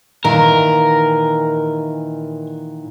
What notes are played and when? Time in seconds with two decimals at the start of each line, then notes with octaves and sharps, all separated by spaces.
0.25 A#2 D#3 E3 A#4